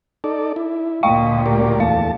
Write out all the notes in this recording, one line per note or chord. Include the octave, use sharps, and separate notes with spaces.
D#4 A4 D5
E4
D2 A#2 D#5 F5 G5 C#6
G4 A#4 D5
E2 A3 F5 A5